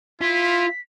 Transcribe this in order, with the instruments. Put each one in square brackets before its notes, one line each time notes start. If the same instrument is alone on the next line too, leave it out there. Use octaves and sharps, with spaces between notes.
[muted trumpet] E4 [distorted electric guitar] F4 [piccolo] B6